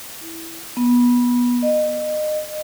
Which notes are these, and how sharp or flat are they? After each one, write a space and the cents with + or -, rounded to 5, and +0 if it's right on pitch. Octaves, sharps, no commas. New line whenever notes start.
E4 -5
B3 -20
D#5 -30